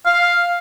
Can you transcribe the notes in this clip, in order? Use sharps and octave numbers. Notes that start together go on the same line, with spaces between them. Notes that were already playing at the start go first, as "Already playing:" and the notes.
F5